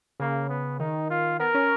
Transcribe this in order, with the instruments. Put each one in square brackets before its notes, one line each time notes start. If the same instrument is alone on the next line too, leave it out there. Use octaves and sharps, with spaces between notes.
[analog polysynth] C#3 [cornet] A#3
[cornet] B3
[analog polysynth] D#3 [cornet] D#4
[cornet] F4
[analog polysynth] B3 [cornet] A#4
[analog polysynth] C#4